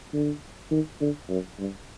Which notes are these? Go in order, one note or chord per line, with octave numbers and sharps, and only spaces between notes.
D3
D#3
D3
F#2
G2